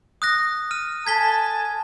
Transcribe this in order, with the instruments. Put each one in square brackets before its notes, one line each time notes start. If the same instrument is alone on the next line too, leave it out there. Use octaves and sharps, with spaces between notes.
[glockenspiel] D#6 F#6 A#6
F6 D#7
[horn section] A4 G#5 A5 [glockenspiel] G#6 B6 G7